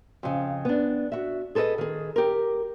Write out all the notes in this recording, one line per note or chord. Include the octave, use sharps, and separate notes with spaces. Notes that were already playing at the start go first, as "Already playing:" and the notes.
F2 C#3
B3 D4
F#4 E5
G#4 A4 B4 C#5 D#5
D#3 G#4
G4 A#4